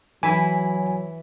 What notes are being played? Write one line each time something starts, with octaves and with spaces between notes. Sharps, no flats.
E3 F#3 E4 G#5